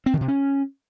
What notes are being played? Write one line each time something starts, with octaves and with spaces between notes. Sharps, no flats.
C4
D#3
C3
C#4